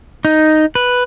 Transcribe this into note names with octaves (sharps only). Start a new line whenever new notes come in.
D#4
B4